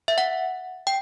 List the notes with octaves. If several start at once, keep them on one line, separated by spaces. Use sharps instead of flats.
E5
F#5
G5